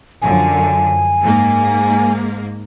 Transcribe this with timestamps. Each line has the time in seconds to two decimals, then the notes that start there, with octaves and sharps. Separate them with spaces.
0.22 F#2 D3 F3 G#5
1.22 G#2 A#3